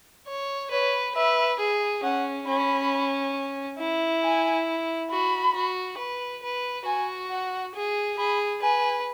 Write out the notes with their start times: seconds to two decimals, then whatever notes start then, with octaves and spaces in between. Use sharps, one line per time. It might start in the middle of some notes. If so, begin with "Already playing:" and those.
0.27 C#5
0.71 B4 C#5
1.15 B4 E5
1.60 G#4
2.03 C#4 F#5
2.47 C#4 B5
3.79 E4
4.23 G#5
5.10 F#4 B5
5.55 F#4
5.99 B4
6.43 B4
6.86 F#4 G#5
7.30 F#5
7.74 G#4
8.18 G#4 B5
8.62 B4 G#5